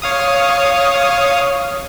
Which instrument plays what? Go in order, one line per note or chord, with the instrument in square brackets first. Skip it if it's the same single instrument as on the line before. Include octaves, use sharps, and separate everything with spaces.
[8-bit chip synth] C#5 F5 D#6